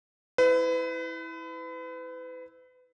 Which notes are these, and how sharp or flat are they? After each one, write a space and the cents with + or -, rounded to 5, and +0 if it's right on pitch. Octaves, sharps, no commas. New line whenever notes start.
E4 -10 B4 +35